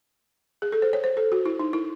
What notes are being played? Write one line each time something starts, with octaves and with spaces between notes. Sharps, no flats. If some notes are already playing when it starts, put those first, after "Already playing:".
G#4
A4
C5
C#5
C5
A4
F#4
E4
D#4
E4